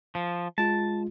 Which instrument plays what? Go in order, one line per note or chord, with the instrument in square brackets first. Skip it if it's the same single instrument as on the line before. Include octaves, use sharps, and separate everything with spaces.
[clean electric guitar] F3
[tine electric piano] G#3 F4 [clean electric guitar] A5